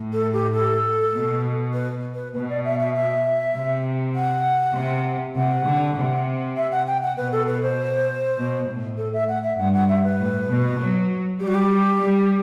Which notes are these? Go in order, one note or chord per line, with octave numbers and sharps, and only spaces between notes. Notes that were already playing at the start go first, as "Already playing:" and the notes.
Already playing: A2
A4
G4
A4
B2
B4
B4
B2 B4
D5
E5
E5
E5
C3
F#5
C3
C3 F#5
D3
C3
E5
F#5
G5
F#5
B2 B4
A4
B4
C5
B2
A2
A4
E5
F#5
E5
G2 F#5
F#5
E5
B4
A2
B2
F#3
G3 G4
F#4
G4
G3